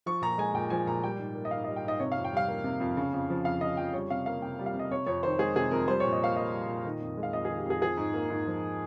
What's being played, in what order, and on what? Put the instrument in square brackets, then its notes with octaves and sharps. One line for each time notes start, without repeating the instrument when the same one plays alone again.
[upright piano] F3 C#6
A#2 A#5
G#3 G#5
A#2 G5
F3 G#5
A#2 A#5
G3 G5
G#2
A#3
D#5
G#2 F5
G3 D#5
G5
G#2 D#5
C3 C#5
F5
F2
G5
G3 F5
A#3
C3
F2
C#3
F2
F3
F2 F5
C#3 D#5
F2 G5
G3 C#5
C3 F5
A#3 F5
C3 G5
G3
F5
C3
D#5
C3 C#5
F2 C#5
D#3 C5
G#3 G#4
C3 G#4
F2 A#4
G3 C5
A#2 C#5
D#5
A#3 F5
A#2 D#5
G3
A#2
D#3
F2
G#3
F5
F2 D#5
D#3 G#4
G4
F2 G#4
F3 G#4
G#2
A#3
G#2
F3